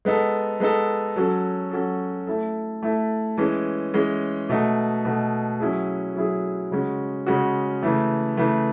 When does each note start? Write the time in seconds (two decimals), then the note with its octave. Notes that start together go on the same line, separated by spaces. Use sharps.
0.05 G#3 B3 D#4 A4
0.60 G#3 B3 D#4 A4
1.16 F#3 C#4 F#4 A4
1.71 F#3 C#4 F#4 A4
2.27 A3 E4 A4
2.83 A3 E4 A4
3.37 E3 G#3 C#4
3.94 E3 G#3 C#4
4.49 B2 A3 D#4
5.05 B2 A3 D#4
5.60 F#3 C#4 E4 G#4
6.16 F#3 C#4 E4 G#4
6.71 C#3 G#3 C#4 F#4
7.27 C#3 G#3 C#4 F#4
7.83 C#3 E3 A3
8.37 C#3 E3 A3